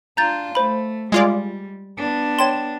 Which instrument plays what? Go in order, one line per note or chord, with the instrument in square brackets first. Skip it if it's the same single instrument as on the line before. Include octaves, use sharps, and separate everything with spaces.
[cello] D4 F4 [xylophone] A#5 G6 A6
[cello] A3 [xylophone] C5 B5
[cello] G3 [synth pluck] G#3 F4 D5
[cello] B3 D4
[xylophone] C#5 G5 C6 [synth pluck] E7